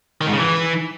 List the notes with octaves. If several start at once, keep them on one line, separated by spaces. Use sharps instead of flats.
D#3
G#2
C#3
E3